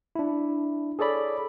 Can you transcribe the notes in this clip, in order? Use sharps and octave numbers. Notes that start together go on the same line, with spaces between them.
D4 E4
G#4 A4 C#5 D5 B5